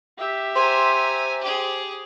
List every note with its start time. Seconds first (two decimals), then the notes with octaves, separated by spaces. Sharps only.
0.18 G4 E5
0.55 C5 G#5 A#5
1.41 G4 G#4